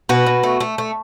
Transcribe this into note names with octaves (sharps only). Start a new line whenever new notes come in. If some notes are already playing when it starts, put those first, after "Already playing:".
B2 F#4 B4
B2
A3
A3
A3